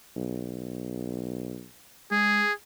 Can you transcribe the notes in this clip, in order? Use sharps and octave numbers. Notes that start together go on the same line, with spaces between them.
B1
G#3 G#4